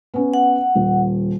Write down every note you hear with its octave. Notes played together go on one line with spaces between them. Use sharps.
B3 C#4
F#5
D#1